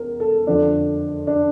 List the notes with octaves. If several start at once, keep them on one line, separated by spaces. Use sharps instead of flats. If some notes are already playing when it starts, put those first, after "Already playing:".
Already playing: E2 A#4
A4
F2 D3 F3 D4
D4